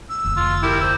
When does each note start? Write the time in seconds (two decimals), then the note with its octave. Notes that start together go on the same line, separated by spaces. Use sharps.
0.09 E6
0.24 F1 D2
0.37 F4
0.63 E4 G4 A#4
0.81 C5 E6